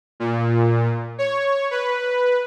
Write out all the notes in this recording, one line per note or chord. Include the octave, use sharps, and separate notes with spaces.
A#2
C#5
B4